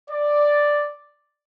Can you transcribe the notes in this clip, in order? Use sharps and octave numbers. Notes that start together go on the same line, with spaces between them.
D5